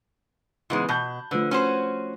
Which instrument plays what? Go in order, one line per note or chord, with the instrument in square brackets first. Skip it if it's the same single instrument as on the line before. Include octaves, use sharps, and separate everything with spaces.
[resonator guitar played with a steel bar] G#2 C#3 G#3 [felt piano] E3 B3
[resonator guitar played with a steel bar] B2 [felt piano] A5 F#6 G6
[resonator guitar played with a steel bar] D3 [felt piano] F3 A3 B4
[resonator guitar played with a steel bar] C#4 F#4 C5